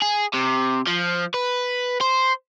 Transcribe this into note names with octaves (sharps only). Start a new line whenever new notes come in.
G#4
C3
F3
B4
C5